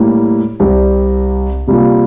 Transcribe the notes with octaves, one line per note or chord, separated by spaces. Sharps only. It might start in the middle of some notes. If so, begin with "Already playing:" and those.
Already playing: A2 G3 A#3 E4
C2 C3 G3 C4 G4
C3 G3 A#3 F4